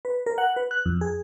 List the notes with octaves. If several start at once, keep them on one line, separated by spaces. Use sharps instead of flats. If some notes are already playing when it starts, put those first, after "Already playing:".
B4
A#4
F#5
B4
F#6
F2
G#4